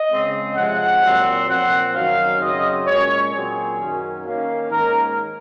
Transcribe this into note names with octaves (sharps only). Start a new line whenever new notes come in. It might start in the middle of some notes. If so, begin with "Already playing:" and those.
Already playing: D#5
C#3 G#3 C4
C3 F3 G#3 F#5
A#2 F#3 C4
A#2 F3 C4 F#5
F#2 D#3 F#3 C#4 F5
F#2 C#3 F#3 C4 D#5
A#2 G#3 C#4 C#5
A#2 F#3 C4 G#4
F#2 D#3 F#3 C#4
D#3 A#3 C#4 F5
G#2 D#3 A#3 C#4 A#4